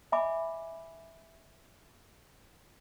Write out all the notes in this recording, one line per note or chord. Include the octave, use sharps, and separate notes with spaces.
D#5 E5 G#5 B5 D6